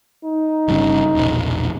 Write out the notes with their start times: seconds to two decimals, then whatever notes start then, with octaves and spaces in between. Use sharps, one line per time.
0.25 D#4
0.68 G1 G2 C#3
1.15 E1 A#1